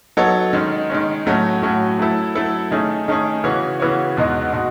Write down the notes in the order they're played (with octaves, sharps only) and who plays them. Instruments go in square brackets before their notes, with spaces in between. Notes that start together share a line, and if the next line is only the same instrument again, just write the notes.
[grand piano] F#3 B3 D#4 A4 C#5
D#3 G#3 C#4
D#3 G#3 C#4
A2 F#3 A3 C#4 F#4
A2 F#3 A3 C#4 F#4
F#3 A3 E4 A4
F#3 A3 E4 A4
D#3 A3 C#4 G#4
D#3 A3 C#4 G#4
C#3 E3 B3 F#4 C#5
C#3 E3 B3 F#4 C#5
E2 B2 G#3 D#4 F#4
B2 G#3 D#4 F#4